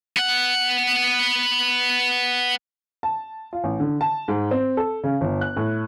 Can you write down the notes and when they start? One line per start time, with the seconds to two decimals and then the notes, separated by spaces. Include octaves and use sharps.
0.17 B3 F#5
3.03 A5
3.53 F4
3.64 A1
3.80 D3
4.01 A5
4.28 G#2
4.51 C4
4.77 A4
5.04 C#3
5.21 G1
5.41 F#6
5.56 A2